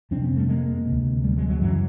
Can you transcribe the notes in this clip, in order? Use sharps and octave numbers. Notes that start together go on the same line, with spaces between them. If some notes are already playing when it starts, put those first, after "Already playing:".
F2 C3 C4 D4
B3 C#4
G3 A3
G#3 A#3
D2 C3
G3 A3
F#3 G#3
F#3 G#3
F#2 C#3 E3 F#3